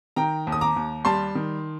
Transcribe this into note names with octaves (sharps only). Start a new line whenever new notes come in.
D#3 G5 A#5
D#2
D#6
A#5 D6
D#2
G3 A5 C6
D#3